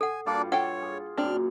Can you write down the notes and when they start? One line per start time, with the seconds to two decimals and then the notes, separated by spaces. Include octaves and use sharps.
0.01 A4 F#5 G#5
0.26 G2 G3 A#3 D4 F4 D5
0.52 A4 C#5 F#5 G5
0.82 G#4
1.17 F#2 A#2 C4 D4 F6